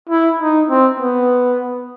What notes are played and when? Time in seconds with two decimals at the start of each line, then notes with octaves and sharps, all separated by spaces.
0.09 E4
0.40 D#4
0.70 C4
1.00 B3